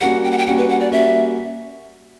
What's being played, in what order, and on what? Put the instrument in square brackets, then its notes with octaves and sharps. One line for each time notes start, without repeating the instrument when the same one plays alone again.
[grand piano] G3 A#3 C#4 F#4 [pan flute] F#5
[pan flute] G5
F#5
G5
[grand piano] G3 A#3 C#4 F#4 [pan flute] F#5
[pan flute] B4
F#5
D5
[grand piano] G3 A#3 C#4 F#4 [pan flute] E5